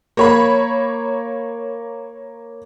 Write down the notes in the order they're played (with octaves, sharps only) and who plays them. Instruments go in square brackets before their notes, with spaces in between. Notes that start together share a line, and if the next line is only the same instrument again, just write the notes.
[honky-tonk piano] A#3 C#5 B5